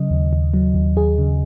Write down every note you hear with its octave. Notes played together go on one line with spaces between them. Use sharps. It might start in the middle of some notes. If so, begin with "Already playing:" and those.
Already playing: C#3 F#3 D#5
D#2
D#2
F#3
D#2
D#2 G#4
C#3